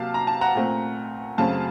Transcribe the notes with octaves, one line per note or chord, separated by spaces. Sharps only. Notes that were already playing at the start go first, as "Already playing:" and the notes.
Already playing: C3 F#3 A#3 F5 A5
A#5
A5
F#5 A#5
A#2 A3 C4
F#2 C#3 F#3 A3 C4 F5 A5